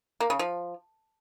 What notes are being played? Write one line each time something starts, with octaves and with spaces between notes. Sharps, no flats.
A#3
C#3
F3